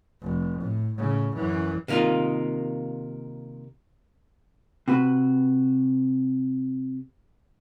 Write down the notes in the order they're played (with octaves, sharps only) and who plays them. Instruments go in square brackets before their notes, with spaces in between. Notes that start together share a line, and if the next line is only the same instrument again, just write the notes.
[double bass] F1
A2
A2 C#3
F#2 E3
[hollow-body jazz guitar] C3 D#3 A#3 D#4 F4
C3 F#4 B4